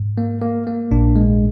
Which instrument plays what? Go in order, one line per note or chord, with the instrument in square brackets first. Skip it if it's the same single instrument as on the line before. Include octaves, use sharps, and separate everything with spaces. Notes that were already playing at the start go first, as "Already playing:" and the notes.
Already playing: [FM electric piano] G#2
[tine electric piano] A#3
A#3
A#3
[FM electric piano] A#1 A#2 [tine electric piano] D4
[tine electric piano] G#3